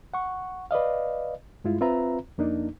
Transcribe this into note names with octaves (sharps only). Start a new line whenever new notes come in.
F#5 C#6
B4 D5 D#5 F5
G2 G#3 E4 F4
C4 F4 B4 E5 A#5
F2 A#3 D4 D#4